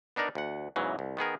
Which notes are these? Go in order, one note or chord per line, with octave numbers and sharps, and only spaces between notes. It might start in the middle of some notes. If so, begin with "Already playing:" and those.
B3 D4 D#4 A#4 D5
D2 F#5
E2 G#2 C#3 E3 F#3
C2
D#3 B3 G#4 A#4